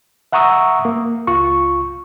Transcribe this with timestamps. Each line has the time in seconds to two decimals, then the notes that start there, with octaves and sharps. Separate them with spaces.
0.32 E5 F#5 A#5 C#6 D#6 E6
0.85 A#3
1.27 C#2 F4 C#6